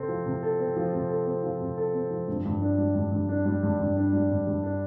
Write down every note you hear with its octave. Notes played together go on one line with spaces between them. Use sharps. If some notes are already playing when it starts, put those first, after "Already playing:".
Already playing: C3 C4 A4
F3
C3
A4
C4
F3
C3
A4
C4
F3
C3
A4
C4
F3
G2
G2
D4
G3
G2
G2
D4
G3
G2
G2
D4
G3
G2
G2
D4